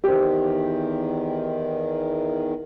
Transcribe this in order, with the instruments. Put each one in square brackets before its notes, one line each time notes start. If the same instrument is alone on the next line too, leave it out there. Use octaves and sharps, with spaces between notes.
[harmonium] E2 D#3 [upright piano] G4 C5